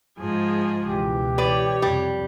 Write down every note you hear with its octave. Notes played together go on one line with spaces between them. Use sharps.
G#2 F3 G#4
C#2 B2 E3 G4
B4 C#5 D5
F2 C3 G3